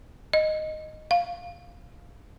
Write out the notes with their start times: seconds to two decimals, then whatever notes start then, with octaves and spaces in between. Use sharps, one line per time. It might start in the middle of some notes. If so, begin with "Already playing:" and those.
0.33 D#5
1.11 F5